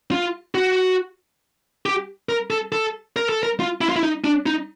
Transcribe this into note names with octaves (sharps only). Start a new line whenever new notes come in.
F4
F#4
G4
A#4
A4
A4
A#4
A4
A#4
F4
E4
F4
E4
D#4
D4
D#4